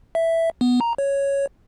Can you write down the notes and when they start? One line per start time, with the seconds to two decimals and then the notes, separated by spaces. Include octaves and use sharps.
0.15 E5
0.61 B3
0.81 A#5
0.98 C#5